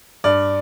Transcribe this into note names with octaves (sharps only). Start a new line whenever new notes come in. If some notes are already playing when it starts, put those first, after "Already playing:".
G2 D5